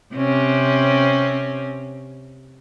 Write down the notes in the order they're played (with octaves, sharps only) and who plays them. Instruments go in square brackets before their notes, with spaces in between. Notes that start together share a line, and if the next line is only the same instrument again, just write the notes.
[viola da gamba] C3 C4 C#4